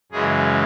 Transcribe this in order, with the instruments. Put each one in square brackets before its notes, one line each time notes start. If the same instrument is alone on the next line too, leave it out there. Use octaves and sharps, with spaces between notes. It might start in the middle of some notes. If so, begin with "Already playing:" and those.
[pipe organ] F#2 C#3 E3 G#3 G#4